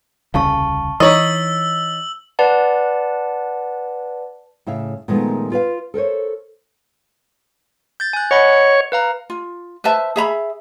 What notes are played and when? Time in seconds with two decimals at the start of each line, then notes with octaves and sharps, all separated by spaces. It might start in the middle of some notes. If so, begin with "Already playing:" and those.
0.34 D#1 C2 C#3 F5 A5 C#6
1.00 E3 D#4 C#5 D#5 E6 A6 B6 F#7
2.39 B4 D5 F#5 A5
4.67 A2 C#3 E5 F5
5.08 A#2 D#3 F3 G#3 A3 B3
5.52 F4 B4 F5
5.94 A4 A#4 C5 C#5
8.00 G6 A6
8.13 G#5 F#6
8.31 C#5 D#5 F#5 B5
8.92 B4 F5 A#5
9.30 F4
9.84 B4 C5 E5 A5
10.16 G#4 E5 A#5 B5